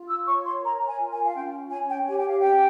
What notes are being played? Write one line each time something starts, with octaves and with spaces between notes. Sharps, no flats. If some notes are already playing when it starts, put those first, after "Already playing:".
Already playing: F4
E6
C#5 C#6
C6
A#4 A#5
G#5
F4
G#5
F5
C#4 G5
C#5 G#5
G5
G4 G#5
G5
F5
C#4 G5